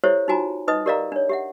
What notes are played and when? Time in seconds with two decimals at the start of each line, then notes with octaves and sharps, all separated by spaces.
0.04 E4 G4 A4 C5 C#5 E5
0.28 D#4 F4 F#4 G#5 A#5
0.68 D#4 B4 D#5 D#6
0.86 G4 A#4 D5 D#5 F5 A#5
1.12 D4 C#5
1.29 G4 E5 F#5